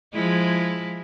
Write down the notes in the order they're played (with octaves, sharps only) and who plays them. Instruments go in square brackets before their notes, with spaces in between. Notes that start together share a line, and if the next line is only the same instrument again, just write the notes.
[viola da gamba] F3 G#3 E4